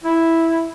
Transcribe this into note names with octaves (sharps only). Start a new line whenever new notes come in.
E4